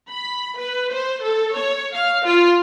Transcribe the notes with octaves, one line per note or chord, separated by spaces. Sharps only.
B5
B4
C5
A4
C#5
F5
F4